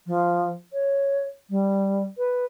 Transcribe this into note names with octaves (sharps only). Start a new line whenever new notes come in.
F3
C#5
G3
B4